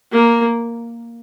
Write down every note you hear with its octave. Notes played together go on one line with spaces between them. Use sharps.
A#3